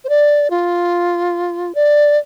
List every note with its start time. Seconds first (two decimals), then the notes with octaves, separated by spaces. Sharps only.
0.04 C5
0.09 D5
0.50 F4
1.75 D5